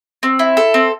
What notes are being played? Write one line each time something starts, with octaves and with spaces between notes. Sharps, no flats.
C4
E4
A4
C4